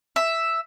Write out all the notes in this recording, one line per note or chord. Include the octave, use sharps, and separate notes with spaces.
E5